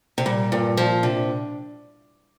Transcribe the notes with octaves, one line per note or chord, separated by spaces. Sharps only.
C3
A#2 G3
G2 A#2
A#2 F3
C3 D4